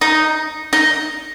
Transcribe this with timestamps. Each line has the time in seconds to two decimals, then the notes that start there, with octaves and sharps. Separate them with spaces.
0.01 D#4
0.73 D#4